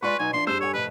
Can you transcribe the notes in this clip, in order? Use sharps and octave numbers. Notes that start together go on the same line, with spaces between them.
G#3 F4 B4 D5 C6 C#6
B2 F#3 D#4 G#5
F3 D4 E4 C6
G2 G#4 C5 E6 E7
A4 C#5 G5 G#5
F2 A2 C3 B4